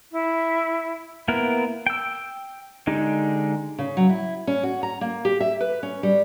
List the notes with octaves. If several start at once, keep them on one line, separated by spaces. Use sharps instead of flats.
E4
A#3 B3 E4 A#4
G5 E6
D3 G#3 D#4 G4
C#3
F#3
E4
C#4
F#4
A#5
A#3
G4
E5
B4
C#4
G3